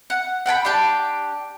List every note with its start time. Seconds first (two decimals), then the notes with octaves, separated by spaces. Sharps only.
0.10 F#5
0.46 F#5 G5 A5 B5
0.65 D4 G4 G5 A5